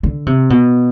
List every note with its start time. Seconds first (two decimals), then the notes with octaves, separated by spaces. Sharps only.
0.03 D3
0.26 C3
0.50 B2